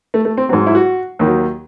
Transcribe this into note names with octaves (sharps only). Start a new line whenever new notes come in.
A3
A3
C4
G#2 F#3 C4
E4
F#4
D#2 D#3 F#3